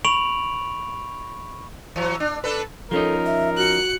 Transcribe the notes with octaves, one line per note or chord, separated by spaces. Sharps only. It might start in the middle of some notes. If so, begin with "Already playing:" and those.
B5 C#6 D7 F7 F#7
E3 F#3
D4
D4 A4 B4
F3 C#4 D#4 A4 A#4
E5
F#4 F#6 C#7